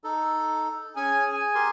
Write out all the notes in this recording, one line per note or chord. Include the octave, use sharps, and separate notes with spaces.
D#4 A4
C#4 G#4 C#5 G#5
G#5
G4 A#4 C6